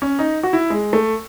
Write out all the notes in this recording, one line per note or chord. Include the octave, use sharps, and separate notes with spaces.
C#4
D#4
F#4
E4
G#3
A3